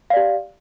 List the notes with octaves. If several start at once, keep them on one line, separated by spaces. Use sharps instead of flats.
G4 D5 F5